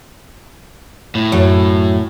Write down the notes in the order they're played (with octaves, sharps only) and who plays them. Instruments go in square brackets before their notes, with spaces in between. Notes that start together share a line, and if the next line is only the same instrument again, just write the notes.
[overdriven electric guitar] A2
[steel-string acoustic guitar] F#2